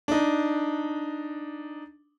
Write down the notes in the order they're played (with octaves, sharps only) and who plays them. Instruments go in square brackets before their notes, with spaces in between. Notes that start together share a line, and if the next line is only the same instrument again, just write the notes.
[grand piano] D4 D#4